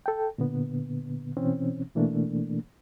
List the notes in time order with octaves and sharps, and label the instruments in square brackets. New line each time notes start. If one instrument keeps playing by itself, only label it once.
[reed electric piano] A4 G5
A#2 D3 B3
B2 E3 C4 C#4
B2 E3 A3 A#3 D4